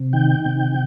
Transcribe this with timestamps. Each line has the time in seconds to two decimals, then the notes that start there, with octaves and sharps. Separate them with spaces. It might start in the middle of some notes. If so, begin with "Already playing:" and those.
Already playing: C3
0.13 D#3 G5
0.46 C3